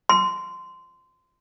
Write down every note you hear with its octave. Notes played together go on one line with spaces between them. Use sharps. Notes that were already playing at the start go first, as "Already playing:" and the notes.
C6